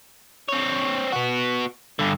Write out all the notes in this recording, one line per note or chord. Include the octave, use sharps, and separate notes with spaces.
C4 C#5
B3 F#4
G2 D3